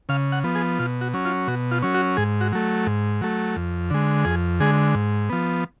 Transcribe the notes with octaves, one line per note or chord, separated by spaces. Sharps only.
C#3 F5
F#5
F3 B3
G#4
B2 F4
F#4
F#3 C#4
F4
B2 F#4
F4
F#3 C#4
F#4
G#2 G#4
F#4
F#3 A3
G#2
F#3 A3
F2
D3 G#3
F2 G#4
D3 G#3 G#4
G#2
F3 B3